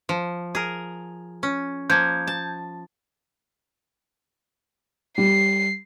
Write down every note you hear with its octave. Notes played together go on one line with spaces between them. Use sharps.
F3
G#4 A#4
C#4
F3 A#3 G6 G#6
A5
G3 C7